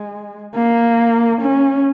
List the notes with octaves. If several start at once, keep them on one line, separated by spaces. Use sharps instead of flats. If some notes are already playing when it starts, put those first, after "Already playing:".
Already playing: G#3
A#3
C#4